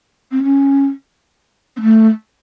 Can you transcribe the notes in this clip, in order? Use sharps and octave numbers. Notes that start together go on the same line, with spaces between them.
C4
C#4
C4
A3